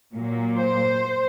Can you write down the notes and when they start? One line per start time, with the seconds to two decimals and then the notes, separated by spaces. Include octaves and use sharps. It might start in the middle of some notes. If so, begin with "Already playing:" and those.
0.14 A#2 F#3 A#3
0.57 C5